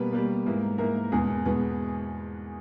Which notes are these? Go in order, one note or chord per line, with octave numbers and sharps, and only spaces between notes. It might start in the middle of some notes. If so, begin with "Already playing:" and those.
Already playing: B2 G3 A#3 B4
B2 G3 A#3
G#2 E3 A#3
G#2 E3 A#3 A#4
E2 B2 G#3 B3 G#4
E2 B2 G#3 B3